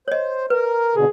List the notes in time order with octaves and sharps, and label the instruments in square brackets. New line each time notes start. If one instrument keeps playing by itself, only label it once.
[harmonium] C5 [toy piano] C#5 D#5
[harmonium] A#4 [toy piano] B4
[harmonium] B2 D3 [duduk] G#4